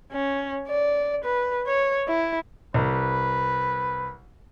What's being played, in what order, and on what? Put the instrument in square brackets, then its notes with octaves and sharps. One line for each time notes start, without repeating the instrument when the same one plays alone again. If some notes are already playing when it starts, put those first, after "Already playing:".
[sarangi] C#4
D5
B4
C#5
E4
[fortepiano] C2 [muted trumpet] B4